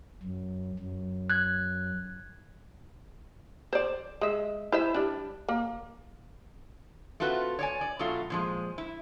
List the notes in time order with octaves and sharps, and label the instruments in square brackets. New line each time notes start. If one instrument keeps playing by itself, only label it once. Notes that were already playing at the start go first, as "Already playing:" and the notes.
[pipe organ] F#2
F#2
[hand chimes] F#6 G#6
[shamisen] C5 D5
G#3 E5
E4 C5 E5
G3 D4
A#3
[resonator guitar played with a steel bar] A3 C4 F4 F#4 B4
C#5 D5 G#5
D5
B2 F#3 A3 F4
A#2 F3 G#3
E4